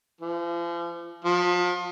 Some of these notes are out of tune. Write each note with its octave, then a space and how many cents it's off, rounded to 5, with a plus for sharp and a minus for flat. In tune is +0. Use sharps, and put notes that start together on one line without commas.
F3 -40
F3 +30